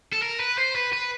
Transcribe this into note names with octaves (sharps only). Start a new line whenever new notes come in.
A4
A#4
B4
C5
B4
B4